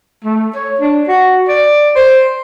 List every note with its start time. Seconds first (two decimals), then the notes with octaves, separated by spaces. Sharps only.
0.25 A3
0.55 C#5
0.80 D4
1.08 F#4
1.48 D5
1.96 C5